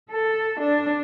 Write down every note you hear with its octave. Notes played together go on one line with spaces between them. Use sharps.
A4
D4